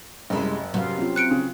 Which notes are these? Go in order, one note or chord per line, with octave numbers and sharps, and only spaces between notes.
F#1 C3 G#3 E4
C3 F#3 B3 F5
C4 C#4 F4
F#6 C#7 D7
C#3